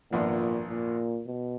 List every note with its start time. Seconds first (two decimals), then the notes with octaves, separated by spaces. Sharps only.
0.11 G#1 F#2 A#2 F3 B3 D4
0.70 A#2
1.27 B2